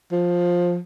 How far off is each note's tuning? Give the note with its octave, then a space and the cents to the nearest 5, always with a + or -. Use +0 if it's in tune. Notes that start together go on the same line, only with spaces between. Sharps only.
F3 +10